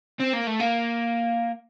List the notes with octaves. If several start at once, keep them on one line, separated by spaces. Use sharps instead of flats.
C4
A#3
A3
A#3